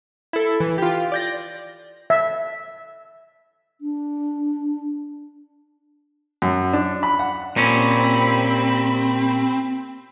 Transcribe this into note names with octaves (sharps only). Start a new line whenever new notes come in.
E4 A4
E3
F4 G4
D5 G6 A#6
E5
D4
F#2
D4
B5
F#5
A#2 C4 C#4 G4 B5